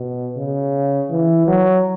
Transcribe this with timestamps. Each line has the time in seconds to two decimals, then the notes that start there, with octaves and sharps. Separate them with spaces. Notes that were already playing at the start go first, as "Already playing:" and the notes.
Already playing: B2
0.36 C#3
1.10 E3
1.47 F#3